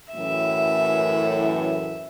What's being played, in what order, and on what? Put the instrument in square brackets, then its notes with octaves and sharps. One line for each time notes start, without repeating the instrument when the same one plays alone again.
[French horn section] F#2 A2 E3 [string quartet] E5